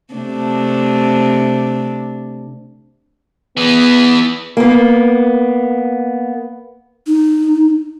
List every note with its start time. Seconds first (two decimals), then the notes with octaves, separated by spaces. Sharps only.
0.14 C3 A3 D4
3.57 E3 B3 G#4
4.57 A#3 B3
7.07 D#4